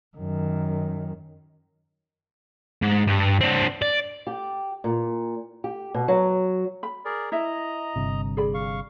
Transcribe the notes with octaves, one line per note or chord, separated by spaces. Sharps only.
F#2 D#3
G#2
G2
C4 D4
D5
G4
A#2
G4
B2
F#3
B5
G#4 A#4 D5
E4 D#5 E5 A#5
G1 G2 C3
G#4 D5 B5
F5 C#6